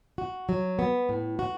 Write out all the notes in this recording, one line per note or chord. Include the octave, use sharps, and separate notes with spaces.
F#4
F#3
B3
A2
F#4